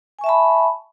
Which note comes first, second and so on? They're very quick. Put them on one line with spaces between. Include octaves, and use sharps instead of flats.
G#5 C#6 E5 A5 B5